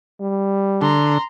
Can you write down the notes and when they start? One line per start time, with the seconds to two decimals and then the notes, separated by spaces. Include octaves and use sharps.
0.21 G3
0.81 D3 A#5 C6